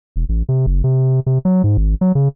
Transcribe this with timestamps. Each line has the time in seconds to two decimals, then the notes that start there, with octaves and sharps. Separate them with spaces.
0.16 E1
0.29 A1
0.49 C3
0.66 F#1
0.84 C3
1.26 C3
1.45 F#3
1.64 G#2
1.77 G#1
2.01 F#3
2.15 C#3